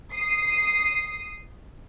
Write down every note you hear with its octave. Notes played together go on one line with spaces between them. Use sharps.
D#6 C7